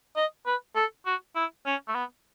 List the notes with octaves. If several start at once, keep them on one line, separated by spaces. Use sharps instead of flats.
D#5
B4
A4
F#4
E4
C#4
A3
B3